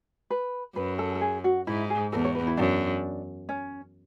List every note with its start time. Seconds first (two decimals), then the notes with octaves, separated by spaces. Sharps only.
0.30 B4
0.76 F#2 B4
0.99 A4
1.15 A4
1.21 G#4
1.44 F#4
1.67 G#2 E4
1.90 G#4
2.12 E2 A4
2.25 C#5
2.35 B4
2.47 E4
2.57 F#2 D4
3.49 C#4